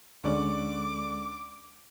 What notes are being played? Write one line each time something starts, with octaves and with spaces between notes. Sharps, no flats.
D2 D3 G#3 C#4 D5 C#6 D6